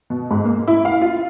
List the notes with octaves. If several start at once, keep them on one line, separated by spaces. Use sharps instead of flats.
B2
G#2
A#3
E4
F5
F4